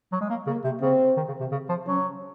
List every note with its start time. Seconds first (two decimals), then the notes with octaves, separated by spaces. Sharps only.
0.12 F#3
0.21 G#3
0.30 A#3
0.47 C#3 A#3
0.64 C3
0.81 C#3 C4
1.17 D#3
1.28 C#3
1.40 C3
1.51 C#3
1.69 F3
1.87 F#3 C#4